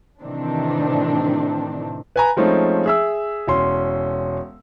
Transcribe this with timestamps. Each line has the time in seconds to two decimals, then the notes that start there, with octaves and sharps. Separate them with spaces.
0.23 A2 C3 D#3 E3 C4 D4
2.16 B4 G#5 A#5
2.37 F3 G#3 A3 C4 C#4 D#4
2.86 G#4 E5 E6
3.47 E1 C#4 C6